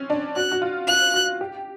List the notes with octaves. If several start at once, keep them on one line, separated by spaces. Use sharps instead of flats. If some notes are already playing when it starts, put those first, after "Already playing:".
Already playing: C4 C#4
D4
F#4 F#6
F#4
F4
F4 F#6
F#4
G4